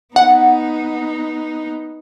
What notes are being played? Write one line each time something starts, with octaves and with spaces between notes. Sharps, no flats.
B3 D#4 F#5